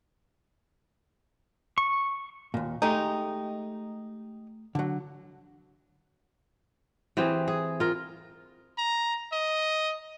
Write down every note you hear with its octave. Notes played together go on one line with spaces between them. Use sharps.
C#6
D#2 A#2
G#3 A3 D#4 G4
D3 F#3
E3 C4 G4 G#4
G#4
F4 A#4
A#5
D#5